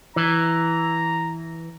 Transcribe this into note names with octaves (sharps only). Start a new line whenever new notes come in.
E3 A#5